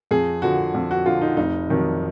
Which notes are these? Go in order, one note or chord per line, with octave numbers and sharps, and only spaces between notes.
F2 G#4
D3 F3 F#4
F2
F#4
D3 F3 F4
D#4
F1 D#4
F2 D#3 F#3